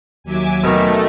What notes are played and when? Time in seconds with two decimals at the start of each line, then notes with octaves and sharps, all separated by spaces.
0.24 D#2 F#3 E5 G#5 D6
0.64 B2 D#3 A3